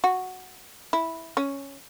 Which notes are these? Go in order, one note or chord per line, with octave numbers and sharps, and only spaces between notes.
F#4
E4
C#4